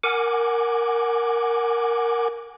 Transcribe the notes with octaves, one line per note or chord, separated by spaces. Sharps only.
A#4 F#5 G#5 D6